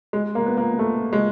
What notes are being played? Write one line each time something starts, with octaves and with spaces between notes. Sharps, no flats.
G#3
A#3
B3
A#3
A3
G#3